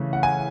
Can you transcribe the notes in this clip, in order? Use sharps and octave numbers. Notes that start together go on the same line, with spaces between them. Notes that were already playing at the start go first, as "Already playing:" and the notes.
Already playing: C#3 E3 A3
F#5
G#5